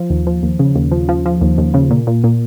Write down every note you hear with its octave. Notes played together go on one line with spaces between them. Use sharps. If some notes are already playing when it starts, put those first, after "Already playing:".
Already playing: F3
D#2
F3
D#2
C#3
D#2
F3
F3
F3
D#2
D#2
C#3
A#2
A#2
A#2